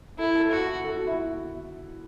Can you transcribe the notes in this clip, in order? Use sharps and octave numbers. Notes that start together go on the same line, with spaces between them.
E4 A4
A4
F#4
A4
F#4
E4